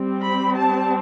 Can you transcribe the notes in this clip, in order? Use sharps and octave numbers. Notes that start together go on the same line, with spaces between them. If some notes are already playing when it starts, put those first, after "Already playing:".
Already playing: G3 C4
B5
A5